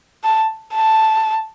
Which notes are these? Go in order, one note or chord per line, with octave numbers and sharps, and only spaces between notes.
A5
A5